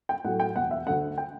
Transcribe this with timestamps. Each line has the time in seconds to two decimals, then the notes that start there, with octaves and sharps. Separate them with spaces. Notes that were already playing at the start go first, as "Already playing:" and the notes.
0.09 G5
0.24 A2 F#3 A3 F#5
0.40 G5
0.56 E1 F#5
0.71 E5
0.87 D2 D3 A3 F#5
1.18 G5